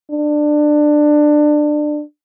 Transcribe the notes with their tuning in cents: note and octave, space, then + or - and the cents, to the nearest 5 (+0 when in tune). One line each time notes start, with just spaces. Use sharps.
D4 +20